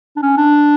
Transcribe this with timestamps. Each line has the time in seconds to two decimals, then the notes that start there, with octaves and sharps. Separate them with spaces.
0.16 D4
0.22 C#4
0.38 D4